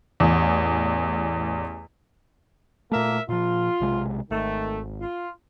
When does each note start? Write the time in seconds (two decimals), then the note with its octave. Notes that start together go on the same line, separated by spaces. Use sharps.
0.20 A1 E2
2.92 A#2 A3 A#3 A#4 E5
3.29 A#2 F3 F4
3.80 B1 C3 G#3
4.31 G#1 D#3 A3
5.00 F4